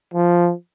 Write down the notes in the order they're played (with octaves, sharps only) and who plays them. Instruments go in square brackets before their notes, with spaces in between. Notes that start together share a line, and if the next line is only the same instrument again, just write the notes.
[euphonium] F3